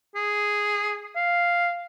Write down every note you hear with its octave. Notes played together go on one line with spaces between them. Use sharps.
G#4
F5